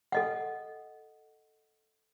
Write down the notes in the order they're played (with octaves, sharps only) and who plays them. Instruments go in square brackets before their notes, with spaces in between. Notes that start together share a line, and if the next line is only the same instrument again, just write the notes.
[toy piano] A4 D#5 F#5